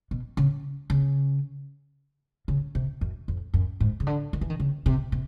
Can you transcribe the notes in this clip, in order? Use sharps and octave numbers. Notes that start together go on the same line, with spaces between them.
B2
C#3
C#3
C#3
C3
F#2
F2
F#2
G#2
C#3
D3
D#3
E3
D#3
C#3
C3
C3